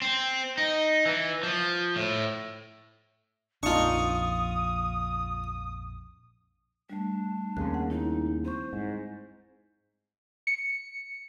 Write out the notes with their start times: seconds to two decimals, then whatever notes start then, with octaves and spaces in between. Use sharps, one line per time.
0.02 C4
0.58 D#4
1.06 E3
1.43 F3
1.96 A2
3.63 A#1 F2 C4 D4 D#4 F4 C#6 D#6
6.90 G3 A3 D4
7.57 D#2 C#3 C4 F#6
7.74 F#5
7.90 D#4 E4
8.45 C4 C5 C#6
8.73 G#2
10.47 C#7